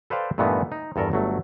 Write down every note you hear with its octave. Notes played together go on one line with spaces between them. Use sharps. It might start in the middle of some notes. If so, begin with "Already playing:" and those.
A4 B4 C5 D5 F5 G5
G2 A#2 E3 A3 B3 D#4
D#4
E2 G2 A4 A#4
G1 F#3 A3